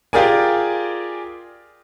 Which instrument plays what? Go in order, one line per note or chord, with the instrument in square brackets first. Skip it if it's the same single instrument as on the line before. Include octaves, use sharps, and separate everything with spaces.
[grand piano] F4 G4 G#4 A#4 D5 G#5